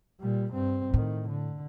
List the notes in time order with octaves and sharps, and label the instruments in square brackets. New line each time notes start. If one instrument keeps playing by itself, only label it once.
[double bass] A#2 G3
G2 C4
[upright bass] A2 [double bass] D#3
[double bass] D3